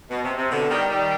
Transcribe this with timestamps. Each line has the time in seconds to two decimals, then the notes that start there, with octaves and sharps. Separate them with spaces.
0.11 B2
0.24 C3
0.37 C3
0.51 B2 D3
0.70 D#3 G3
0.90 D#3 G3